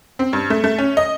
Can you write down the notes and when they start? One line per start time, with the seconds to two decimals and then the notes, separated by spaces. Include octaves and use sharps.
0.19 C4
0.33 G2
0.50 A3
0.64 A3
0.78 C#4
0.97 D#5